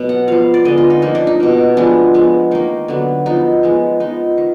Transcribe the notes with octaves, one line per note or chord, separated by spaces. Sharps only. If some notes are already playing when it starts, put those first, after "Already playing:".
Already playing: B2 F#3 B3
F#5
F3 B3 F5
D5
D3 G#3 B3 D#5
F4
D#4
F3 A#3 D#4
D4
D#4
B2 A#3
F3 G#3 B3 D4
F3 G#3 B3
D#3 A#3 D#4
D3 F#3 B3
F3 B3 D#4
F3 G#3 B3
F3 B3 D#4
D#3